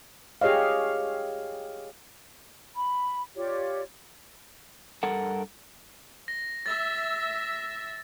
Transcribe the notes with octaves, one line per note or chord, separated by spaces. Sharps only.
G4 G#4 C#5 D#5 F5
B5
F4 G4 C#5 D5
G2 A4 A#4 F#5
A#6
E5 A6